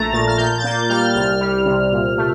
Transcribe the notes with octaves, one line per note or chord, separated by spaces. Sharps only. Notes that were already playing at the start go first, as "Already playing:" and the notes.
Already playing: A#1 A3 A5 A#5
A#2 A6
F6
A#2 G6
A6
A#3 G6
G3 F6
C2 F6
G3
C3
A#2
A3